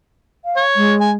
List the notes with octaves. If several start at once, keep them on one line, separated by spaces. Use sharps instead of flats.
F5
C#5
G#3
G#5